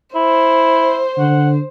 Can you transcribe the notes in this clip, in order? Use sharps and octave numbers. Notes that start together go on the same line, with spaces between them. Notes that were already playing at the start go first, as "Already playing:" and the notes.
E4 C5
D3 F#5